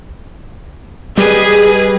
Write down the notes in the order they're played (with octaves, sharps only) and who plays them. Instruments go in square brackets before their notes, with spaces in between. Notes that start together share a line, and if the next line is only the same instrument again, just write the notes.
[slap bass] G3 [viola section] G#4 B4 D#5